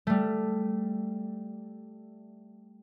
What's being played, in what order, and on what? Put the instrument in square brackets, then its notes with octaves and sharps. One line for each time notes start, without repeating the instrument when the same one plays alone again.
[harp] G3 A3